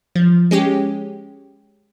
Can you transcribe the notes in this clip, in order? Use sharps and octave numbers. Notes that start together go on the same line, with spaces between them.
F3
G#3 C#4 G4